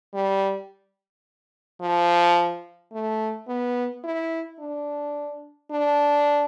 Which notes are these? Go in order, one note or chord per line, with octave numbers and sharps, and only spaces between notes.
G3
F3
A3
B3
E4
D4
D4